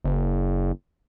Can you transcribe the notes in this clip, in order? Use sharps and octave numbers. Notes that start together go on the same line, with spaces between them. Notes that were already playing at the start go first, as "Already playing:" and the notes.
F#1